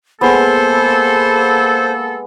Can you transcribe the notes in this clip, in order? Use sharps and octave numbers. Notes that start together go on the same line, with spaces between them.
G#3 A#3 B3 A4 C5